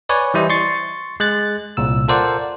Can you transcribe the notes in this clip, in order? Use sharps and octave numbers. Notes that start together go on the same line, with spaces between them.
B4 C#5 D5 G#5
E3 G3 E4 C5 D#5
C6 C#6 A6
G#3 F#6 A6
C2 A#2 E6
F4 A4 A#4 C5 D5 F#5